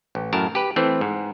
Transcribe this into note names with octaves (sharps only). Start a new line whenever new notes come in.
A1
F#2 A2 A#4 A5
G4 B4
E3 A3 C4
G#2